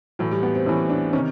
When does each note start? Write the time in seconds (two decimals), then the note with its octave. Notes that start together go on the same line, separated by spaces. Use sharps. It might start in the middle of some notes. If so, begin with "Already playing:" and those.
0.19 A2 E3 F#3
0.31 G3
0.43 B3
0.55 C4
0.66 A2 C#4
0.69 E3
0.90 D4
1.13 C3 D#3 C#4